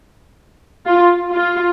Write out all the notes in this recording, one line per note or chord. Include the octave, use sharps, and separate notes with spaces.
F4
F4